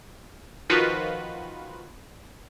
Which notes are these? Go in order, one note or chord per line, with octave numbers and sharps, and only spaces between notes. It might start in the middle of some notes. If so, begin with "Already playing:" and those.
D#3 F3 F4 F#4 B4